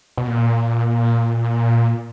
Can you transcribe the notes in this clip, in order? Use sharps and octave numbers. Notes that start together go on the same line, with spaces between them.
B2
A#2